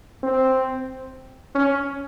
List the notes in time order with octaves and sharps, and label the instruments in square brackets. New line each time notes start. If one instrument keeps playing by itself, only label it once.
[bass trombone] C4
C#4